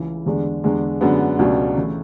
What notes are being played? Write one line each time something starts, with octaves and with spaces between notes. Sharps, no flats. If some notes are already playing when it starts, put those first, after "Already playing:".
Already playing: C#2 C#3 E3
E2 D3 G#3 D4
E2 D3 G#3
F#2 D3 G#3 B3
C#2 B2 F#3 A3 D4
C#3 E3 A3 E4